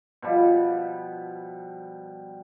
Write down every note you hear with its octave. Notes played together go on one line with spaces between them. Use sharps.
B2 F3 G3